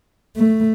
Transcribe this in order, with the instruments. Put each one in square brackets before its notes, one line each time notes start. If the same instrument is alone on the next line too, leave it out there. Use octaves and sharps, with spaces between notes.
[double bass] A3